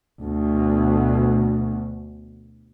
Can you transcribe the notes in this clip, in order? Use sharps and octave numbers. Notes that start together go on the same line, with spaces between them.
D2 B2